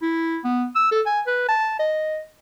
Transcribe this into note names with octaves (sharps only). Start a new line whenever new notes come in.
E4
B3
E6
A4
G#5
B4
A5
D#5